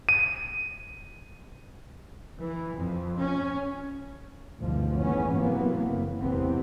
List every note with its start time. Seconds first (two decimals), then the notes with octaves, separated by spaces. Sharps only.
0.09 D#7
2.39 E3
2.76 F2
3.17 C#4
4.59 G#1 D2 G2 B2 E3 F3
4.96 G#1 F2 G#2 E3 B3 C#4
5.33 C3 E3 F#3 A#3 B3
5.85 F#1
6.16 G#1 E2 C3 E3 B3 C4